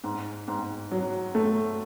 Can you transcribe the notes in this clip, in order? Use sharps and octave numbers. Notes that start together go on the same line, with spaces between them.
G#2
G#2
F#3
A3